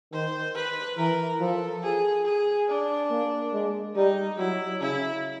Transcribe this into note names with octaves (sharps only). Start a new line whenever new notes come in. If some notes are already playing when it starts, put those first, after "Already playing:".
D#3 C5
B4
E3 A#4
F3 A4
G#4
G#4
D4
A#3
G#3
G3 D#4
F#3 E4
C#3 E4